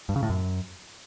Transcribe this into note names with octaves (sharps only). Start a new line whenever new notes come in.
G2
C#3
A2
F#2